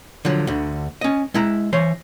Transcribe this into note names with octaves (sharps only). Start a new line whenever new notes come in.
D3 F3 F#3
D2 D3
C#4 D#5
G#3 E4 A#5
E3 C5 C#5